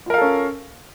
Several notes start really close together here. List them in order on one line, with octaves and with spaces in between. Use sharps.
F4 A#4 F5 A4 C#4